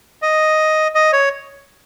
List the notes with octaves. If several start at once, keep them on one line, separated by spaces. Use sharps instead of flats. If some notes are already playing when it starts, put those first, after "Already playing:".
D#5
D#5
C#5